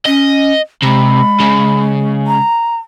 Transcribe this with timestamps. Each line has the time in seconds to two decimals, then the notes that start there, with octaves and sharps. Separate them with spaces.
0.06 C#4 D#5
0.83 C3 G#3 B5
1.41 C#3
2.27 A#5